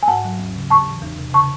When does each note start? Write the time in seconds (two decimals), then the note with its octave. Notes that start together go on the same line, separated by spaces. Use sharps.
0.03 G#5
0.08 G#2 F#5 A5
0.25 F#3
0.39 D#2
0.55 C#3
0.70 A2 A5 C#6
0.87 E3
1.02 E2
1.19 C3
1.33 C#3 A5 C#6